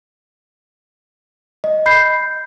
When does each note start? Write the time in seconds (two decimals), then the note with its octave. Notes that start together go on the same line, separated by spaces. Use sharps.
1.64 D#5
1.86 B5 G6 C7